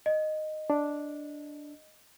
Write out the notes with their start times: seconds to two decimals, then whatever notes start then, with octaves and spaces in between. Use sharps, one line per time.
0.06 D#5
0.70 D4